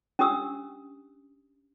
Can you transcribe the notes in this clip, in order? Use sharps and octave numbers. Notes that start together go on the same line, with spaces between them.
C#4 D4 G4 D#6 E6